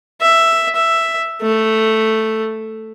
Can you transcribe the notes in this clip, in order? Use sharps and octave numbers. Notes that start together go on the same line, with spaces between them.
E5
E5
A3